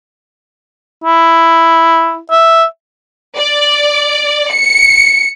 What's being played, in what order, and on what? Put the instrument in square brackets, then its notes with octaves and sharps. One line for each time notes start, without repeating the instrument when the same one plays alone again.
[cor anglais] E4
E5
[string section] D5
C#7